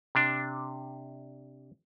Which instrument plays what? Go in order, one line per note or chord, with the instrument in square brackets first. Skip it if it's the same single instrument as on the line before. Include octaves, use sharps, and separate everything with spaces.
[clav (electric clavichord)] C3 D4